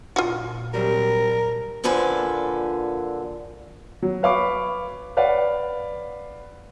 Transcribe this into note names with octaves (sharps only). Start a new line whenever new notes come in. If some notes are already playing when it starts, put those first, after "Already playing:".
A#2 F4 F#4
C3 F#3 G3 A#4
A#2 D3 F3 A4 B4 G#5
F#3
B4 C#5 F5 B5 C#6 D6
B4 C#5 D5 F5 F#5